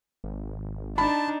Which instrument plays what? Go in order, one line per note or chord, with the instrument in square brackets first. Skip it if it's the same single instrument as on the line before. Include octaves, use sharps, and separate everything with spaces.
[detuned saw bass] G#1
[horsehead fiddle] D4 D#4 [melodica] A5 [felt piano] B5